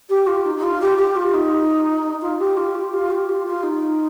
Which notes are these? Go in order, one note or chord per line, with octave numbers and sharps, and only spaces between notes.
G4
F4
D#4
D#4
F4
G4
G4
F4
D#4
F4
G4
F4
G4
F4
G4
F4
F4
D#4